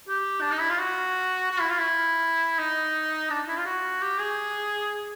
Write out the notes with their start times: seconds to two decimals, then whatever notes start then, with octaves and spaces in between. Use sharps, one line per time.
0.08 G4
0.41 D4
0.51 D#4
0.60 E4
0.70 F4
0.79 F#4
1.51 F#4
1.60 E4
1.69 F4
1.78 E4
2.59 D#4
3.30 D4
3.48 E4
3.57 F4
3.66 F#4
4.02 G4
4.20 G#4